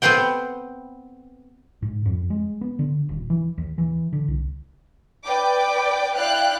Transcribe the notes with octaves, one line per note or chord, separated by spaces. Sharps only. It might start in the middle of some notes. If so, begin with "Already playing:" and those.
B3 C4 C5 F#5 G5
G#2
F2
G#3
B3
D3
D#1
E3
D#2
E3
D3
C2
B4 D5 G5 D6
E4 D5 F5 G5 F#6